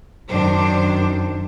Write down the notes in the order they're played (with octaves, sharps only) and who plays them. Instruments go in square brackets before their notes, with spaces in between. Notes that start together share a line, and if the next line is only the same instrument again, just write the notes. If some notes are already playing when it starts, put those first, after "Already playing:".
[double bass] F#2 [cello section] D#3 D4 C5